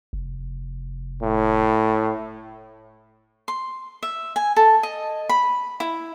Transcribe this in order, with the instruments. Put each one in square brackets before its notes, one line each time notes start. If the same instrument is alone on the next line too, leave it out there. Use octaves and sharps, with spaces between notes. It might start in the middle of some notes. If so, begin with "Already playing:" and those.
[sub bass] F1
[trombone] A2
[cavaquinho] C6
E5
G#5
A4
D#5
B5
E4